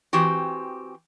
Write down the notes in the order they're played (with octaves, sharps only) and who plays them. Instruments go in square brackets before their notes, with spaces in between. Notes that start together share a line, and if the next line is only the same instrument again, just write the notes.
[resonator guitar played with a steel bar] E3 C4 F#4 G4